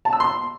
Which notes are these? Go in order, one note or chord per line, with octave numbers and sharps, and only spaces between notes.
A5
E6
C6